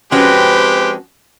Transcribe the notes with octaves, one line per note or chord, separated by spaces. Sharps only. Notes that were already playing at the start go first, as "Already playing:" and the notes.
F3 G#3 C4 C#4 F#4 G4 B4